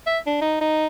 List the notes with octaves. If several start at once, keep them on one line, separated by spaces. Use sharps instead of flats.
E5
D4
D#4
D#4